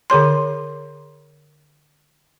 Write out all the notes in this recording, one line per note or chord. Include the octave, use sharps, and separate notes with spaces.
D3 G#4 C#5 C6